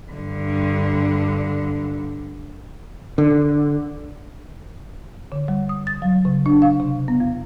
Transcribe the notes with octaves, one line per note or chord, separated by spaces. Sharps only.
G2 D3
D3
D3
G3
D#6
A6
F#3
C#3
D4
F5
C3
B3
F2